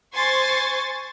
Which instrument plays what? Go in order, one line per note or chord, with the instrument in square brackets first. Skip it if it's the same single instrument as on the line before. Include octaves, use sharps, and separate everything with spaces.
[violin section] C5 G#5 C6 C#6 A6